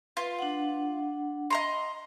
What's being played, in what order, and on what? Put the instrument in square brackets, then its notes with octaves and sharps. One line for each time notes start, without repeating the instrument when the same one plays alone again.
[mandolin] F4 [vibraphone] B4
[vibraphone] D4 F#5
[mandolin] D#5 A#5 C6